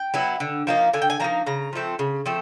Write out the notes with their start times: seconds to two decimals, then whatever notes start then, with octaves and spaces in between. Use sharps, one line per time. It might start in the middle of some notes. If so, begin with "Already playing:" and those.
Already playing: G5
0.14 F#3 B3 E4
0.40 D3
0.67 F3 A#3 D#4
0.93 D3 G#5
1.02 G5
1.10 G#5
1.20 F3 A#3 D#4 A#5
1.47 C#3 A#5
1.73 F3 A3 C4
1.99 C#3
2.26 F3 A3 C4